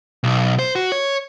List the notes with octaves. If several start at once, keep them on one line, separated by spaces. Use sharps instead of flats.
B1
C5
F#4
C#5